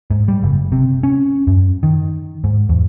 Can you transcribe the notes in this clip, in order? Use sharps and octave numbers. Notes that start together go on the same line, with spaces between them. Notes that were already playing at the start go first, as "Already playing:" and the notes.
G#2
G3
F#1
C3
C#4
F#2
D#3
G#2
E2